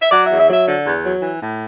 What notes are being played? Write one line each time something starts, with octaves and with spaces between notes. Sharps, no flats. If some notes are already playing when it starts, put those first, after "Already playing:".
E5
F#3 D5
E2 E5
E5
F#3
E5
D3
E2
F#3
E3
A2